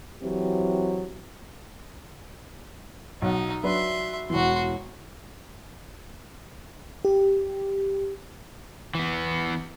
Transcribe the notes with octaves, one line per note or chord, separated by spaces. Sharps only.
E3 F#3 C4 G4
B1 D#4 F#5
F#3 D4 B4 E5 C6
E1 E3 F#4 C6
G4
E3 B3